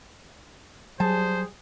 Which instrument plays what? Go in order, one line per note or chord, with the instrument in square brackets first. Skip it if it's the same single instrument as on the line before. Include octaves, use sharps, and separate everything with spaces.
[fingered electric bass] F#3 [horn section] G3 G#4 [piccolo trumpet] C5 [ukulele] A5